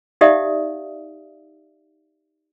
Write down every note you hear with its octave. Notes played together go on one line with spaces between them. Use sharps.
D#4 G4 D5 E5 F5 D#6